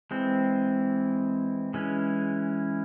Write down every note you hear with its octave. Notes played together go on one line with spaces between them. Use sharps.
E3 G#3 C4
E3 G#3 C#4